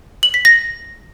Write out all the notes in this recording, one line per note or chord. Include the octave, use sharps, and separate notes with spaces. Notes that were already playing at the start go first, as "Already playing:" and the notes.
F#7
B6
A#6